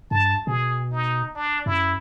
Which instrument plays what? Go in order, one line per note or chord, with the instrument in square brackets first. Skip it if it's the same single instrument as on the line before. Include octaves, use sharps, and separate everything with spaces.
[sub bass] G2 [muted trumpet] A5
[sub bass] B2 [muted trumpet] G#4
[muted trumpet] D#4
D4
[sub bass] F#2 [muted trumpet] E4